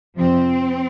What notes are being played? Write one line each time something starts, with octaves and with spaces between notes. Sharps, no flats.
F2 C3 F3 C4